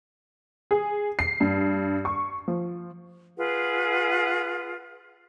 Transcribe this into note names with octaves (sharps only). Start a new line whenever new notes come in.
G#4
C7
G2
C#6
F3
F4 G#4 B4 F#5